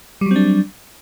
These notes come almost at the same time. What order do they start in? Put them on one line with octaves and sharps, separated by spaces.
G3 F#3 C4 D4